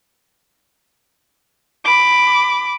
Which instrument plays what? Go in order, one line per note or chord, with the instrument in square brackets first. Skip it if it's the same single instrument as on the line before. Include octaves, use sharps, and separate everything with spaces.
[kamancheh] B5 D6